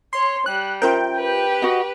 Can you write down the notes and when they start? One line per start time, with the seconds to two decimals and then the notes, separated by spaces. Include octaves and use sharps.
0.13 C#5 C6
0.46 G3 F#6
0.82 C#4 F4 A#4 C5 E5 G5 A#5
1.17 G4 B4
1.62 F#4 D#5 F#5